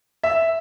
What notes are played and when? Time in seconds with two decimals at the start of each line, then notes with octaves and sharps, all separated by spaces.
0.23 E5